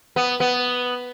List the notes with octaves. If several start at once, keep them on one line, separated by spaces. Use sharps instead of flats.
B3
B3